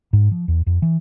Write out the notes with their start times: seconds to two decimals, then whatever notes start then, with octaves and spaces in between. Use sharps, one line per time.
0.13 G#2
0.31 F3
0.48 E2
0.67 F2
0.82 E3